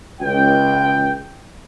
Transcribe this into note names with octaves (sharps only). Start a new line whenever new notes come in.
C#2 G5